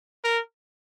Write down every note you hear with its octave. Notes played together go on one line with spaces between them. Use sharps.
A#4